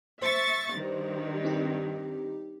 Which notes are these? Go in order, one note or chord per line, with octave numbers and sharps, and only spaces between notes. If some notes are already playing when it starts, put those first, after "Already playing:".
C5 E5 C#6 A6
G2 D#3
C4 D#4 G4